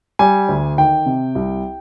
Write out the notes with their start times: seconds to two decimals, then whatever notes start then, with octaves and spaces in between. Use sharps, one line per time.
0.19 G3 G#5
0.49 D2
0.78 D#3 G5
1.06 C3
1.35 C2